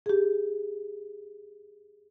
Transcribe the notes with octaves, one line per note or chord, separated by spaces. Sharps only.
G4 G#4